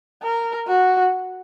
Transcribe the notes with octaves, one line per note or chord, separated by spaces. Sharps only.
A#4
F#4